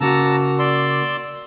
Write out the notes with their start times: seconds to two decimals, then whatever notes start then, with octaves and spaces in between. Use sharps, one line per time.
0.01 C#3 A#3 F#4 A5 A#5 E6
0.59 D5 C6 E6